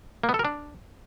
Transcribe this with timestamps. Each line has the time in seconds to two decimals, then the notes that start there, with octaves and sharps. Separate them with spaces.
0.23 A#3
0.29 B3
0.34 A4
0.39 A#4
0.45 D4